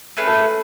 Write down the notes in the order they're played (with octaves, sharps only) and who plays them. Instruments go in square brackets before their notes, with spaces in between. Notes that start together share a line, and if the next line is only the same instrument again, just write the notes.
[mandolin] A3 C#4 G#4 B4
[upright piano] A4